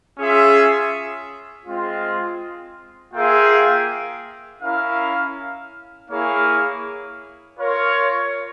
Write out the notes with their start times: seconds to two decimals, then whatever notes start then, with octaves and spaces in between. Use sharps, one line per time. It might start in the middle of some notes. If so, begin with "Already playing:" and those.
0.18 C#4 F4 G#4 E5
1.66 G#3 C4 F4
3.14 A#3 F4 G#4 E5 G5
4.62 C#4 E4 A#4 F5
6.10 A#3 E4 G#4 C#5 F5
7.58 F4 A#4 C#5